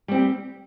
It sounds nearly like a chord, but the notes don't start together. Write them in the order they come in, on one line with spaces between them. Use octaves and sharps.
G3 C4 G4